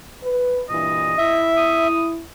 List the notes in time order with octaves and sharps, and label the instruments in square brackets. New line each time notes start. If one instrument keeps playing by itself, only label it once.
[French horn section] B4
[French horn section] G2 A#2 E3 [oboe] D#5
[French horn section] E4 [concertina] E5
[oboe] D#6